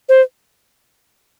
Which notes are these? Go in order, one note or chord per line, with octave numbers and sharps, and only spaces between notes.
C5